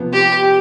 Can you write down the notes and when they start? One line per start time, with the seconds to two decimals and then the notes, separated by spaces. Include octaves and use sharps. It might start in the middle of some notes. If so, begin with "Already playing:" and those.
Already playing: C3 F3 B3
0.13 G4